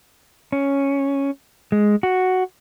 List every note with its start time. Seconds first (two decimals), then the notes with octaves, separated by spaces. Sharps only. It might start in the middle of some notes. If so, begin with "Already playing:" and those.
0.52 C#4
1.72 G#3
2.03 F#4